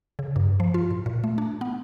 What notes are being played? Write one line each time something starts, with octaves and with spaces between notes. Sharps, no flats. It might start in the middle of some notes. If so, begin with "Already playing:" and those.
C#3
G2
F3
F4
A2
A#2
A3
D4
B3